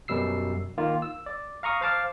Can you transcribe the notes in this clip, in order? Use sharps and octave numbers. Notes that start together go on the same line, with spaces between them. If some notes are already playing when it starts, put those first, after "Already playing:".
F#2 B2 G3 E6 C7
D#3 A#3 F4
E6
D5
F5 A#5 C#6 D#6
C5 F5 A5 D6